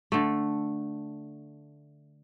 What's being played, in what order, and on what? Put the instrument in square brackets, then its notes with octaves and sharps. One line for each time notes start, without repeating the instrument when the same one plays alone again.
[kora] D3 A3